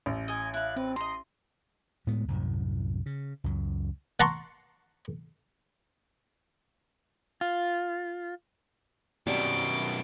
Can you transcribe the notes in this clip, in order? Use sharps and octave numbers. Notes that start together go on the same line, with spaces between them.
A1
D#5 G#5
E4 F5 F#6
C4 B4
D#5 A#5 C6
A2 G#3 A3 B3
C2 F#2 A2
C#3
C#2 F#2
F#5 A5 A#5 C6 C#6
F4
F#2 B2 G3 B3 C4 D6